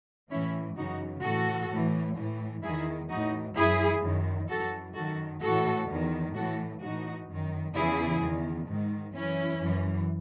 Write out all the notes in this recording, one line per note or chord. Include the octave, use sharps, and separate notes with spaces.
A2 E3 C#4 E4
F#2 C#3 E3 D#4 F#4
A2 E3 F#4 A4
A2 E3
A2 E3
E2 D#3 E4 G#4
A2 E3 D#4 F#4
F#2 E3 E4 G#4
F#2 D#3
F#2 E3 F#4 A4
F#2 D#3 F#4 A4
A2 E3 F#4 A4
E2 D#3
A2 E3 F#4 A4
A2 E3 D#4 F#4
F#2 D#3
E2 C#3 E3 E4 G#4
E2 D#3
G#2 D#3
F#2 E3 C#4 E4
F#2 E3